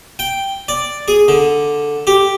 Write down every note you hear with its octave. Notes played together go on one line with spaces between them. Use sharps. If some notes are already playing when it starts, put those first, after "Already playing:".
G5
D5
G#4
D3
G4